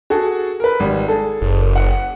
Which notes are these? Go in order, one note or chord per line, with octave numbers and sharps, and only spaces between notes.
F#4 G#4 A4
A#4 B4
G#1 G3
G#4 A4
F#1
F#5